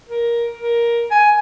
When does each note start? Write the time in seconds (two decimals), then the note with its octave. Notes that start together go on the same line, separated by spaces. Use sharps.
0.09 A#4
0.59 A#4
1.11 G#5